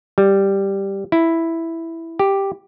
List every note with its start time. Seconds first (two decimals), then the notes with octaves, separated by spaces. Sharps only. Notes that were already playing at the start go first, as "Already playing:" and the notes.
0.18 G3
1.12 E4
2.19 G4